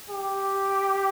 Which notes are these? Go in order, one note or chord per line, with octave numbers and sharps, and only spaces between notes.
G4